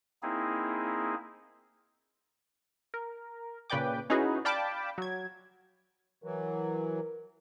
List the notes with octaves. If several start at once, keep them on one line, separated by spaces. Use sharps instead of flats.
A#3 C4 D#4 E4 G#4
A#4
A#2 C#3 B4 D5 G5 D6
C#4 D#4 E4 F#4 G#4 B4
D5 F5 G5 A5 B5 D6
F#3 G#6
E3 F#3 A#4